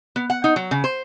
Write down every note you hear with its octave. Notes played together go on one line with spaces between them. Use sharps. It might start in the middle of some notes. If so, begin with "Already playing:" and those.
B3
F#5
D#4
F#3
C#3
C5